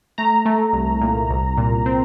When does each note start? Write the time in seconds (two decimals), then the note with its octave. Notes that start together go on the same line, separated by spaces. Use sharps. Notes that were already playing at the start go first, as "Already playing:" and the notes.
0.18 A3 A#5
0.45 A3
0.73 C2
1.01 A#2
1.30 C2
1.57 A#2
1.86 C4